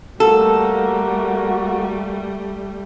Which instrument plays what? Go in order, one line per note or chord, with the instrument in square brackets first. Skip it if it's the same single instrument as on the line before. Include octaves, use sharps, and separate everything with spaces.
[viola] G3 A3 [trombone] A#3 [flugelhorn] F#4 [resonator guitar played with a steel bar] A4